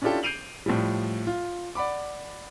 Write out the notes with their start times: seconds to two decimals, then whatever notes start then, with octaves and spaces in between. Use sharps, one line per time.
0.02 C#4 D4 E4 F4 G4 A4
0.23 G6 C7 D7 D#7 F7 F#7
0.66 A2 F3 G3
1.27 F4
1.75 D5 F#5 B5 D6